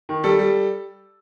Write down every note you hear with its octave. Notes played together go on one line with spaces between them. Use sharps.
D#3
G3 A4
G3